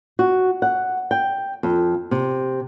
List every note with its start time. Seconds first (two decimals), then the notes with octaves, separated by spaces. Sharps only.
0.19 F#4
0.62 F#5
1.11 G5
1.63 F2
2.11 C3